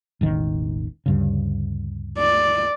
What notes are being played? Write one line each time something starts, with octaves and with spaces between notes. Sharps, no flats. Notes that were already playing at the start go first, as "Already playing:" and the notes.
E1 A1 D#3
D2 G2 C#3
D5